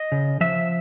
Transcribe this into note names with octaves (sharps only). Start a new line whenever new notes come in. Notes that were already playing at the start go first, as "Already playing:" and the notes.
Already playing: D#5
C#3
F3 E5